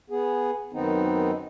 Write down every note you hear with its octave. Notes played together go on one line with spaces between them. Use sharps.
B3 G#4
F#2 D#3 B3 C4 D#4